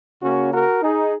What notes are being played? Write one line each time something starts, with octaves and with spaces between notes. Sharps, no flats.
C#3 A#3 C#4 F#4
F#4 A#4
D#4 G#4